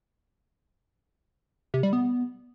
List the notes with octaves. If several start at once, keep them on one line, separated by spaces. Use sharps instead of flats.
C3
G3
B3